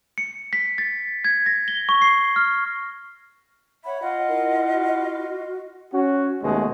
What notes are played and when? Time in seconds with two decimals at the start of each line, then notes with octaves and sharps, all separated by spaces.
0.18 C#7
0.53 B6
0.78 A6
1.24 G#6
1.46 A#6
1.68 G7
1.89 C#6
2.02 C7
2.36 F6
3.84 C#5 E5 F#5 B5
4.01 F4 D#5 F5 F#5
4.28 E4 A#4
4.73 F#4
5.93 C#4 F#4
6.42 D#2 B2 G#3 A3